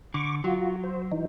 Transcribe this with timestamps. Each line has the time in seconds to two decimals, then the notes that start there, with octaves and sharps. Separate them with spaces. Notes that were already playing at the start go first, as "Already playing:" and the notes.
0.14 D3 C#6 D6
0.44 F#3 F4 F#4
0.84 C5
1.11 E3 D#4